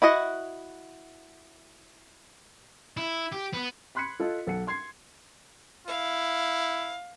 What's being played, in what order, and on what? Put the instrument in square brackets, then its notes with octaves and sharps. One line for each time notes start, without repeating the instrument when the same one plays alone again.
[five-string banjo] E4 F#4 D#5 F#5
[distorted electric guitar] E4
G4
B3
[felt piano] B5 C6 F#6 G#6 B6 C#7
F4 A4 D#5
B1 A4 F#5 C#7
C6 G#6 C7
[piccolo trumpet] E4 [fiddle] F5